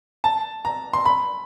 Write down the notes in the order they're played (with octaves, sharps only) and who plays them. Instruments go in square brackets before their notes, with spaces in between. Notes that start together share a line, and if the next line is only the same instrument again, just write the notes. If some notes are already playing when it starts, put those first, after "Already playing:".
[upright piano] A5
A#5
C6
B5